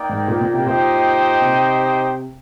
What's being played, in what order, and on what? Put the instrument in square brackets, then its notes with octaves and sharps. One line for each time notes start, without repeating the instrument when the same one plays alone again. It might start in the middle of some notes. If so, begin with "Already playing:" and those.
Already playing: [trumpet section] A#3 D#4 A#4 D5 G5
[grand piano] G#2
A#2
A#2
C3
[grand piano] A#2 [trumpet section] D#4 G4 C5 D#5 G5
[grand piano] C3